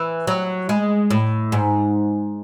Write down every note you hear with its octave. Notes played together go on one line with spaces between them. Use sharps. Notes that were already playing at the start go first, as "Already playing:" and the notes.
Already playing: E3
F#3
G#3
A2
G#2